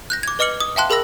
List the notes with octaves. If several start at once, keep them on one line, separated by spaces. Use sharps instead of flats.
F#6 G6 A#6
D6 G#6
B4 D#5 D6 F6 C#7 F#7
D#6
E5 F5 G5 A5 C6 F#6
G#4 A#4 B5 E6 A#6